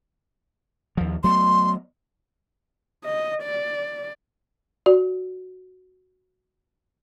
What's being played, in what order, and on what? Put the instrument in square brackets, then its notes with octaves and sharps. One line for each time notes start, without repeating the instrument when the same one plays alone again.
[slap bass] D#2 F3
[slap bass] F#3 A3 B3 [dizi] C6
[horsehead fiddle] D#5
D5
[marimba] F#4 D5